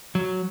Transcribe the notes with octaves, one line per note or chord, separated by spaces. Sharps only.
F#3